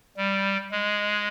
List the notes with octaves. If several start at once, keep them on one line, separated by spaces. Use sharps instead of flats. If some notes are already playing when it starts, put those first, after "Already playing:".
G3
G#3